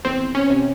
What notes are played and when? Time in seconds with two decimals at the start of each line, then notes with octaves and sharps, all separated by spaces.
0.05 E2 C4
0.35 C#4
0.50 C3